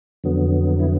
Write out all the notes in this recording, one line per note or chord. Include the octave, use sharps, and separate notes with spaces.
F2 D3 F#3 B3
E4